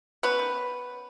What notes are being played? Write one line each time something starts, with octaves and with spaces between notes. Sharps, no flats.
B3 C#4 B4
D#3